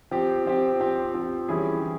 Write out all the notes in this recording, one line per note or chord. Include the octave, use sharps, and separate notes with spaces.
F3 C4 G4
F3 C4 G4
F3 C4 G4
F3 C4 G4
E3 G3 C#4 E4 G#4
E3